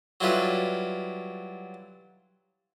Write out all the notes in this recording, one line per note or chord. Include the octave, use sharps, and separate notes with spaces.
F#3 G3 E4 F4 A4 B4